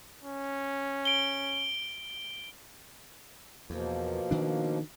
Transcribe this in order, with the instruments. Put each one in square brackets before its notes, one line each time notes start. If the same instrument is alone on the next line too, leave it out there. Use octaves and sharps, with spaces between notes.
[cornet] C#4
[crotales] D7 G7
[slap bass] E2 [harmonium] B2 F3 A#3
[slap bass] D#3 D4